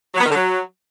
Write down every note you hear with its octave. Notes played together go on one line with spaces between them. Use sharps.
F#3
B3
D#3
D3
F#3